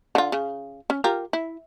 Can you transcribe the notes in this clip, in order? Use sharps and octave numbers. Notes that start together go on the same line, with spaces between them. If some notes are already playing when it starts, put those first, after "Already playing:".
D3 F4
C#3
C#4
F4 G4 A#4
E4